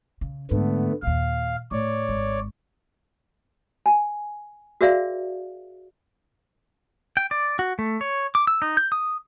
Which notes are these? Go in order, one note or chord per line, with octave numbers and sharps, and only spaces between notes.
C#3
G#2 D3 A3 B3
D#2 A#2 F5
A2 C#5 D5
G#1
G#5
F#4 G#4 A#4 D5 E5 F5
G5
D5
F#4
A3
C#5
D6
E6
D#4
G6
D#6